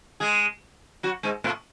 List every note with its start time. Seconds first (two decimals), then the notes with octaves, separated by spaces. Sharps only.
0.20 G#3 G#4
1.03 F#3 F#4
1.23 G#2 G#3
1.44 A2 A3